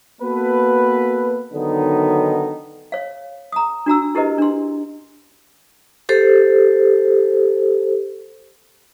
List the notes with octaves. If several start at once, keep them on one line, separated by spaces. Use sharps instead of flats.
A#3 B3 F#4 A4 B4
D3 D#3 F#3 B3 D#4
C#5 F5
A#5 D#6
D4 F#4 A#5 E6
E4 G4 A#4 B4 D#5
D4 C6
G4 A4 C5